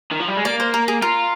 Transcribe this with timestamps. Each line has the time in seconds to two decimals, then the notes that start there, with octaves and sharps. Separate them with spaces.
0.11 D#3
0.20 F3
0.28 G3
0.37 G#3
0.45 A#3 D5
0.60 C5
0.74 A#4
0.88 G#4
1.02 F4 A#4